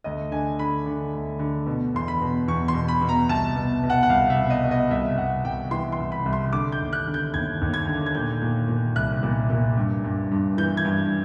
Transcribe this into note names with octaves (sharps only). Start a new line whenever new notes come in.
D2 D#5
D3 G#5
D3 B5
D3
D2
D3
B2
E2 C6
B5
B2
E2 C#6
C6
B2
B5
B2
A#5
C2 A5
B2
B2
F#5
F#5
C2 F5
E5
B2
D#5
B2
D#5
C2 E5
C2 F#5
C2 G5
E3 C6
C6
C2
B5
C2
C6
D3 D6
G6
D#2
F#6
D3
G6
D#2 G#6
D#2
G#6
D3
G#6
A#2 G6
A#2
A#2
C2 F#6
A#2
A#2
G2
G2
G2
E3 G6
G#6
G2